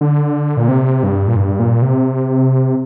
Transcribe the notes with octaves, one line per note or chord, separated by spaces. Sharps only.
D3
A#2
C3
G2
A#2
G2
A#2
C3